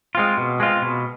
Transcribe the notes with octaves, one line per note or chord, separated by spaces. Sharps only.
G#3 C4 F4
B2
G#3 C4 F4
B2